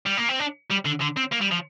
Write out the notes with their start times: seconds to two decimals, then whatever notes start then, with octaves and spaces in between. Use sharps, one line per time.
0.06 G3
0.17 A#3
0.29 C4
0.40 D4
0.70 G3
0.85 D3
1.01 D3
1.17 C4
1.32 A#3
1.41 G3
1.51 F3